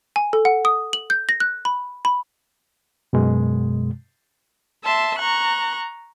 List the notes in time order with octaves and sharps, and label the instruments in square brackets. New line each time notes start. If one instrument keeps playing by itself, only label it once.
[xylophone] G#5
A4
F#5
D#6
F#7
G6
A#6
F#6
B5
B5
[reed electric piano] F#2 B2 G#3
[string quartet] E5 A5 C6
A#5 C#6 F#6